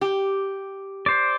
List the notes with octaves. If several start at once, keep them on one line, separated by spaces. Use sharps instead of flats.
G4
C5 D5